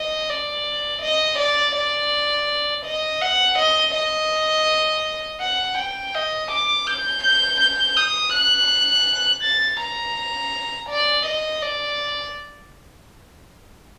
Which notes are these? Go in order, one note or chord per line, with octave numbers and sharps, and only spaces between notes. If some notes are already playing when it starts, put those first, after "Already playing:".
Already playing: D#5
D5
D#5
D5
D5
D#5
F#5
D#5
D#5
F#5
G5
D#5
D6
G6
G6
G6
D#6
F#6
A6
A#5
D5
D#5
D5